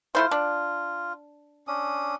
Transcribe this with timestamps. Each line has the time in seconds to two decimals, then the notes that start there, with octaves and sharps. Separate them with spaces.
0.15 A3 E4 F4 C5
0.31 D4
1.67 C#4 D4 D#6